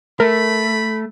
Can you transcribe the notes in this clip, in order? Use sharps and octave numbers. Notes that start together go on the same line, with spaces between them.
A3 A#4 B5